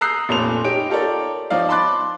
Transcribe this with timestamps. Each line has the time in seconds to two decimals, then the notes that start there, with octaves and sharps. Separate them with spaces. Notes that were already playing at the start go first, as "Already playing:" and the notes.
0.01 A#5 D#6 E6 F#6 G6 C7
0.29 F1 A#2 C#4 A4 C6 F7
0.64 D#4 G4 C#5 D7
0.90 F4 G4 A4 A#4 C#5 D5
1.50 F3 D#4 C#5 D5 F5
1.69 A5 B5 C6 D6 F#6 A6